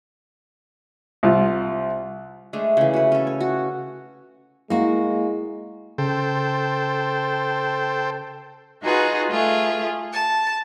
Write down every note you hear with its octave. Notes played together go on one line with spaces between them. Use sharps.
C2 F4
G#3 A3 D4
C#3 E3
F#4 B4
C#4 A4
C#5
F#4
G#3 A#3 E4 F#4
C#3 A4 C5 G5
D#4 F4 F#4 G#4 B4
A3 F4 G#4
A5